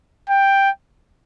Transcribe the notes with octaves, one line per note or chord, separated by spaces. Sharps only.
G5